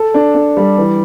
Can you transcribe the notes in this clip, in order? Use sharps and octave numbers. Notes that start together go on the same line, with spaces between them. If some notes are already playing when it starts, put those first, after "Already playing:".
Already playing: A4
D4
D4
G3
E3